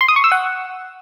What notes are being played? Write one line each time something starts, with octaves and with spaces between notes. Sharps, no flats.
C6
D#6
C#6
E6
F#5